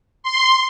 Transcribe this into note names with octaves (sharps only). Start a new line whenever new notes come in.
C6